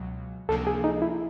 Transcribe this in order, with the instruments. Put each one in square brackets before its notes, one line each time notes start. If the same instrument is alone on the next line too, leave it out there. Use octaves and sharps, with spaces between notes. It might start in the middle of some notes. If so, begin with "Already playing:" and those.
Already playing: [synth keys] C#2 B2 F#3
[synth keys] C#2 C3 F3 A#3 D4 [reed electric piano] A4
[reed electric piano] G#4
D#4
E4